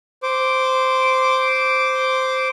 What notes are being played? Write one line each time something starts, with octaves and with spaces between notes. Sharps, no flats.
C5 D6